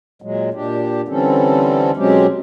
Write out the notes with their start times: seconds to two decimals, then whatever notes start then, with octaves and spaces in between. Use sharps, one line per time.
0.22 A#2 F#3 G#3
0.54 A#2 D4 G4
1.08 D3 E3 G3 C4 C#4 A4
1.97 B2 F#3 G#3 C4 C#4 G4